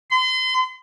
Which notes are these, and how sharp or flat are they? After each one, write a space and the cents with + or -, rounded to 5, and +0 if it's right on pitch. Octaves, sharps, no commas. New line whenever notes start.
C6 -35